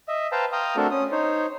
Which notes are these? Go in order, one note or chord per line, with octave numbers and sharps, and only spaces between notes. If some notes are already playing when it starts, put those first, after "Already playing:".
D#5 E5
B4 C5 F5 G5 A5 A#5
F5 G5 A#5 C6 D#6
A3 C4 D4 F#4 A4 A#4
C#4 D#6
D#4 C5 C#5